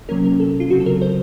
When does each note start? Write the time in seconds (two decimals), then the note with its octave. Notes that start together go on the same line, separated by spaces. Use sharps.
0.09 C3 F#3 A#3 C#4 A#4
0.24 A#4
0.40 A4
0.60 F4
0.70 C#3 F#3 C4 F#4
0.80 A4
0.86 A#4
1.02 C5